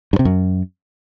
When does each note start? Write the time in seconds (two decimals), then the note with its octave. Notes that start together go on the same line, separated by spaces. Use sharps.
0.13 G2
0.19 C3
0.25 F#2